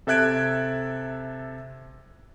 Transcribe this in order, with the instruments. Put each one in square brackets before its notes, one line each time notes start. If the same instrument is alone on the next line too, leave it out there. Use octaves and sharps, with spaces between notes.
[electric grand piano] C3 A4 E5 F#6 G#6 D7